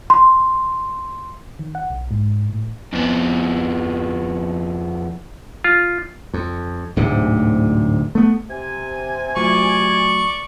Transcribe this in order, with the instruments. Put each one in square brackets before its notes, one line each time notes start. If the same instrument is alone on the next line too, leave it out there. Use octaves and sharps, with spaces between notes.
[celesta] C6
[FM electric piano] D#3
F#5
B1
G#2
A2
[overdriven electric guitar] F2 B3
[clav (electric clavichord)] F4
[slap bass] F2
D1 D2 G#2 C3
A3 B3
[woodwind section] C3 G#5
[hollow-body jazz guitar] F#3 A3 F4 [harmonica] D5 C#6